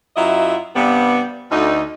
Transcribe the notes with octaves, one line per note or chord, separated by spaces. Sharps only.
F#2 F#3 E4 F4 D#5 E5
G2 C3 G3 B3
D2 D#4